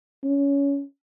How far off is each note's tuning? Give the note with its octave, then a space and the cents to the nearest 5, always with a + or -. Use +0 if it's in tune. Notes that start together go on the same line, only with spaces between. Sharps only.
C#4 +20